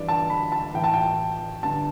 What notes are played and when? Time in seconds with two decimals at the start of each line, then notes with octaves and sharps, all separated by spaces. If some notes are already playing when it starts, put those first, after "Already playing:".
Already playing: G2 E3 D5
0.09 A5
0.30 B5
0.52 A5
0.74 A2 E3 G5
0.84 A5
0.94 G5
1.63 G2 D3 A5